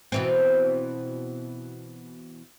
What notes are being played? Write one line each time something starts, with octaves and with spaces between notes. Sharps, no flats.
B2 E3 C4